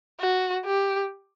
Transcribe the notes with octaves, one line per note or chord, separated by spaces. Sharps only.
F#4
G4